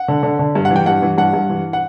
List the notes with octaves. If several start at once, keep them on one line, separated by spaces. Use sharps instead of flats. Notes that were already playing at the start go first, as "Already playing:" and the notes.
Already playing: F#5
D3
D3
D3
G2
F#5
E3
G5
G2 F#5
E3
G2 F#5
G2
E3
F#5